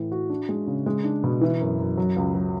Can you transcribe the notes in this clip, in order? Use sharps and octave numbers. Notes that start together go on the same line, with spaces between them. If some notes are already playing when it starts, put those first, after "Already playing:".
Already playing: A2 E3
F#4
D4
G#3
C#3
G#3
D4
B2
E3
F#2
F#2
F#3
C#2
F#3